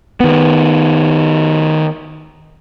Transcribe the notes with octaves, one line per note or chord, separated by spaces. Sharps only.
D#3 B3